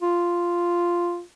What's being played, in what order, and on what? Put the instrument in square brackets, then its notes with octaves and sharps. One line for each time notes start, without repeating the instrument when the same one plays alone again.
[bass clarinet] F4